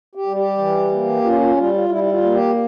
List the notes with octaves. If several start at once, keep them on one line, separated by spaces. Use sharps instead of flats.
G4
G3
G4
E3
A#3
C#4 F4
F4
G3 F4
F4
G3 E4
E4
F4
A#3
G4